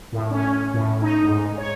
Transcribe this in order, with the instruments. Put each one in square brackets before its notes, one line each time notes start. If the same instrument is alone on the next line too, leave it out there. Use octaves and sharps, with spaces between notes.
[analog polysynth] A2
C#4
A2
D#4
G#2
C#5